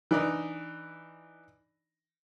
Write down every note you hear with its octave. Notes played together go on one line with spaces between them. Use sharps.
E3 D4 D#4